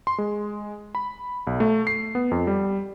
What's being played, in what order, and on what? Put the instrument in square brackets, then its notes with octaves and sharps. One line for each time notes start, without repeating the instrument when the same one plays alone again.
[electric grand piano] C6
G#3
B5
B1
A3
C7
B3
F2
G3